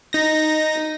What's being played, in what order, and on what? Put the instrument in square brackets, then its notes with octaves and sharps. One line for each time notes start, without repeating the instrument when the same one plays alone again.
[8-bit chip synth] D#4 A#6